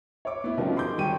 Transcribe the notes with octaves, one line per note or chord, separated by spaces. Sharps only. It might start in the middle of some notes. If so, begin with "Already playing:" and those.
C#5 D6
B3 E4
B2 D#3 F3 G3 C4 C#4
G#4 C6 D6 G6
G#1 G3 G5 C#6 D#7